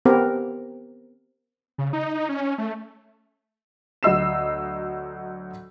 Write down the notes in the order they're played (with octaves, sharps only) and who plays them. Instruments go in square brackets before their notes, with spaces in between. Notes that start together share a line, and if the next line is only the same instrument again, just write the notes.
[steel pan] B3 C4 G4 A#4
[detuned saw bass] C#3
D#4
C#4
A3
[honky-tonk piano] D2 F#3 D#5 E6 C7 E7